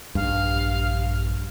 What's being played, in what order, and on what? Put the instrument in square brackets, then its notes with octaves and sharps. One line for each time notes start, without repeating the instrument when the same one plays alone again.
[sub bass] A#1 [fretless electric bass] G2 [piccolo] F5